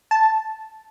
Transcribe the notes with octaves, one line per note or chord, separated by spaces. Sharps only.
A5